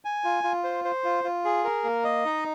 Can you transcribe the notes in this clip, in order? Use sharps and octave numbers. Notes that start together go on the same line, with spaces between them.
G#5
F4
F4
C5
C5
F4
F4
G#4
A#4
A#3
D#5
D#4